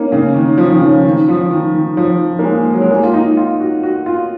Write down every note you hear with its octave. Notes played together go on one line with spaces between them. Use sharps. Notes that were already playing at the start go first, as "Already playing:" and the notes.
Already playing: A#3 C#4 D#4
C#3
D#3
F3
D#3
C#3
D#3
F3
D#3
D#3
F3
A#3
G#3
F#3
G#3
A#3
F4
D#4
F4
F#4
F#4
F4